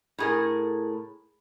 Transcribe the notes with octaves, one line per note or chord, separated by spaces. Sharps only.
A2 G#4 A#4